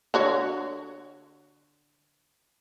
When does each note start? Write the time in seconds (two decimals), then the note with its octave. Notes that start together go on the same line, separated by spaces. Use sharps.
0.14 D3 F#4 C#5